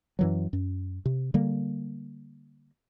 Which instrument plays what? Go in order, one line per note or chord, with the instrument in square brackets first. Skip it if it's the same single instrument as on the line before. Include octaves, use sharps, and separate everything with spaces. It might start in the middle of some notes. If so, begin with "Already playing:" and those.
[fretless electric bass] F#2 E3 F#3
F#2
C3
D3 G3 A#3